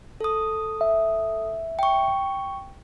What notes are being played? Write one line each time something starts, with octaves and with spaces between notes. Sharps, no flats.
A4 D#6
E5
G5 C#6